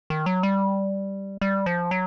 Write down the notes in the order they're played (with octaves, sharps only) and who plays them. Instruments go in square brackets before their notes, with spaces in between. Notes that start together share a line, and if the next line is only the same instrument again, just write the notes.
[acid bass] D#3
F#3
G3
G3
F3
F#3